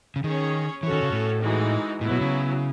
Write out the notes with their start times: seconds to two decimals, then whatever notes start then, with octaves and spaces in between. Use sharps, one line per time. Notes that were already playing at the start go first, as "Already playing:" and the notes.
0.16 C#3
0.24 D#3 C#4 G#4 C#5
0.83 E3 C#4 F#4 A4 C#5
0.92 D#3
1.03 C#3
1.12 A2
1.42 E3 G#3 D#4 F#4
2.01 A2 F#3 B3 E4
2.11 B2
2.21 C#3